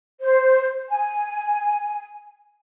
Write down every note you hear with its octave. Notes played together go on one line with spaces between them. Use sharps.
C5
G#5